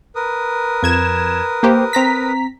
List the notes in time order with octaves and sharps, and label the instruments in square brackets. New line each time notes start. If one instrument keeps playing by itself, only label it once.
[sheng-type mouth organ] A#4 B4 D#6
[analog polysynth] F2 G#6 E7
A#3 G4 C5
C4 A#5 B6